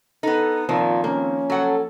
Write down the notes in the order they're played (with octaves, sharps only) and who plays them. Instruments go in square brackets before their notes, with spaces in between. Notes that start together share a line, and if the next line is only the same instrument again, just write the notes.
[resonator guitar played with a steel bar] B3 D#4 [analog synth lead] A4
[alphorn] A#2 [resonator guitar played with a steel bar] D#3 [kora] F3 [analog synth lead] C4
[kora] A#3 [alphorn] C#4
[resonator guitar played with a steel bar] F#3 F#5 [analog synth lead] A4